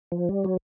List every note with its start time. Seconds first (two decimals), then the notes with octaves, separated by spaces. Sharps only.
0.12 F3
0.29 G3
0.44 F#3